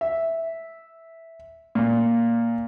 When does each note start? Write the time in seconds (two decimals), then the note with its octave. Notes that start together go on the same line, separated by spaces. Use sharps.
0.01 E5
1.75 A#2